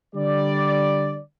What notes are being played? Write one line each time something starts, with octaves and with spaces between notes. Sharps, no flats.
D3 G3 D5